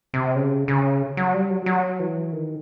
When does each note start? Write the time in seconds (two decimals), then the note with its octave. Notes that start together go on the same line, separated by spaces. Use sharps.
0.14 C3
0.35 C#3
0.68 C#3
1.17 F#3
1.34 G3
1.50 F#3
1.66 F#3
2.00 E3
2.33 D#3